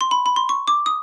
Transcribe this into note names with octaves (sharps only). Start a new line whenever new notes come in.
C6
B5
B5
C6
C#6
D6
D#6